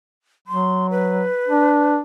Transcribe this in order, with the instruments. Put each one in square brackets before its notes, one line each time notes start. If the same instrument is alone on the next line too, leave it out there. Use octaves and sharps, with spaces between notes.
[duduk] F#3 [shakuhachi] C6
[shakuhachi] B4
[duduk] D4